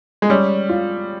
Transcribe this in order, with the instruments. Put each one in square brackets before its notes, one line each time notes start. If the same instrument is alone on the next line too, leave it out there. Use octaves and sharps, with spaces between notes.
[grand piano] G#3
[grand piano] G3 [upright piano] C#4
[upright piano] F4